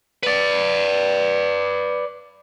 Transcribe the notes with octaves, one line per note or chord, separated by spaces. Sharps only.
B4 D5